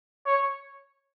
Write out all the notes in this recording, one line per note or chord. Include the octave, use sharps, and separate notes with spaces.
C#5